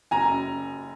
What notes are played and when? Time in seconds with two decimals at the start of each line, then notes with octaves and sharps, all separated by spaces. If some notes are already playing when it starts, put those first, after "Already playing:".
0.11 F#1 G#5 A#5
0.30 F#2